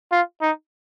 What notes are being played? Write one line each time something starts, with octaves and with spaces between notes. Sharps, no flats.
F4
D#4